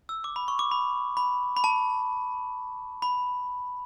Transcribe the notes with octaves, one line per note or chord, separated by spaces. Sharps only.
E6
D6
B5
C#6
D6
B5
B5
B5
A5
B5